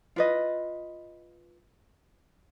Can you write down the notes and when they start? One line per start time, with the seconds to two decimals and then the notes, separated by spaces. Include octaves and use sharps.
0.16 F4 B4 D#5